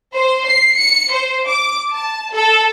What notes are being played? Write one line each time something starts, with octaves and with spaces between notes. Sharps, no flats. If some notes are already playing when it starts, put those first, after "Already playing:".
C5
C7
C#7
C5
D6
A5
A4